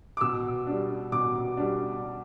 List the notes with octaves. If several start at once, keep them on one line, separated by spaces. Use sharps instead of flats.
D6
B2 E6
G3 D4
B2 D6
G3 D4